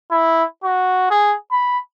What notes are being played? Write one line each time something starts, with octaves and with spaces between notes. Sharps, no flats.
E4
F#4
G#4
B5